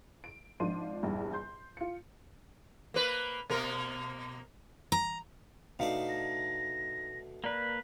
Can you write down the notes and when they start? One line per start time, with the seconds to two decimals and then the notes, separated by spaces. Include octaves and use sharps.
0.24 D7
0.60 G#1 F3 D4 C6 D#7
1.03 A#1 E2 G2
1.33 C6 G6
1.77 F4 C#7
2.94 A#3 B4
3.50 B2 A#3 A#4
4.92 A#5
5.79 B2 A3 D4 D#4 D#5 F5
6.09 A#6
7.44 A#3 B4 D5 A#5